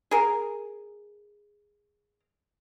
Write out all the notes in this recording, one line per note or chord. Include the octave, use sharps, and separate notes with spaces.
G#4 A#4